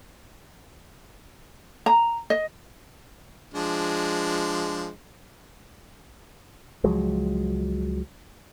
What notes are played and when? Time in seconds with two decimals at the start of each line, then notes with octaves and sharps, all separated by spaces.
1.86 A#5
2.30 D#5
3.54 F3 G#3 D4
6.84 C#2 F3 F#3 G#3